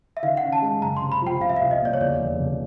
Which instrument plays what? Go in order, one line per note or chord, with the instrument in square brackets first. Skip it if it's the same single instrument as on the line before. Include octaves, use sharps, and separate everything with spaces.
[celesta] E5
[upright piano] D#3 [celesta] F5
[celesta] F#5
[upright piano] C#4
[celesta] A5
[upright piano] G#3
[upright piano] F#1 [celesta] A#5
[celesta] C6
[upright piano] C3
[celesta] B5
[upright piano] F3 [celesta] G5
[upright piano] C2 [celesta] F5
[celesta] E5
[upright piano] C2 [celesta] F5
[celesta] D#5
[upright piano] A#2 [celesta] D5
[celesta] C#5
[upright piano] E2 [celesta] D5
[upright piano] F1
F1